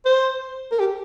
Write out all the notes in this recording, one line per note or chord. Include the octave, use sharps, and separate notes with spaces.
C5
A#4
G4